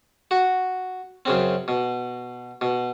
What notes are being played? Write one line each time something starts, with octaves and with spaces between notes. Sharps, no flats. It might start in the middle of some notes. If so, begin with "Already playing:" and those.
F#4
F#2 C#3 C4
B2
B2